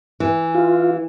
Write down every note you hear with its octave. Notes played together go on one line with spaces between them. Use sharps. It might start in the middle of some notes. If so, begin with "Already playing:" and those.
E3
F4